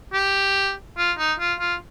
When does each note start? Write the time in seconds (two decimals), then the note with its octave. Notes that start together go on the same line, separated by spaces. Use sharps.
0.13 G4
0.97 F4
1.18 D#4
1.39 F4
1.60 F4